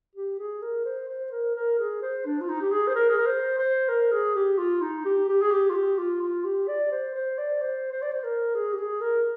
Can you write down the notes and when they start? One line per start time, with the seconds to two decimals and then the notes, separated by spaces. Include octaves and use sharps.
0.16 G4
0.39 G#4
0.62 A#4
0.85 C5
1.09 C5
1.32 A#4
1.55 A#4
1.79 G#4
2.02 C5
2.25 D4
2.41 F4
2.49 D#4
2.61 G4
2.72 G#4
2.87 C5
2.95 A#4
3.09 G#4
3.18 A#4
3.26 C5
3.58 C5
3.88 A#4
4.12 G#4
4.35 G4
4.58 F4
4.81 D#4
5.05 G4
5.28 G4
5.42 G#4
5.51 G4
5.70 F4
5.75 G4
5.98 F4
6.21 F4
6.45 G4
6.68 D5
6.91 C5
7.15 C5
7.38 D5
7.61 C5
7.92 C5
8.02 D5
8.12 C5
8.24 A#4
8.55 G#4
8.73 G4
8.78 G#4
9.01 A#4